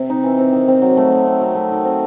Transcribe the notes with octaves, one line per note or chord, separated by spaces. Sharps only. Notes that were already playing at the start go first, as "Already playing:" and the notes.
Already playing: C3 C4
D#4
E3
C4
D#3
C4
F#3
A3
D#3
C4
F#3
A3
D#3
C4